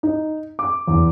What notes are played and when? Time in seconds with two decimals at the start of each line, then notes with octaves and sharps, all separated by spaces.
0.03 D#4
0.59 D6
0.88 E2